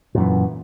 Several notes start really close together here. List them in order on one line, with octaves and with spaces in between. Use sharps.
A#2 F#2 E3